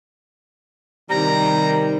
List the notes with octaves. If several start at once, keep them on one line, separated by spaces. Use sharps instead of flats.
C3 D#3 G3 A#5